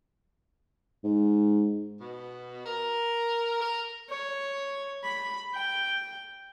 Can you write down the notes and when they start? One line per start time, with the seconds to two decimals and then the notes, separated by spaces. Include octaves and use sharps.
1.04 G#2
2.01 B2
2.66 A#4
3.60 A#4
4.10 C#5
5.04 B5
5.54 G5